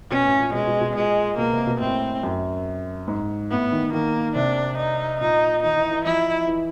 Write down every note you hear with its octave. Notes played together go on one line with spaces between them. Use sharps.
B2 C#4
A2
A#2
B2 G#3
B2
B2
A#2 G#3
B2 A#3
C3
B2
A2 C4
F#2
G#2
A2 B3
D#3
D#3 A#3
C3 D4
D#4
A#2 D#4
D#3 D#4
E3
E3
F3 E4
E3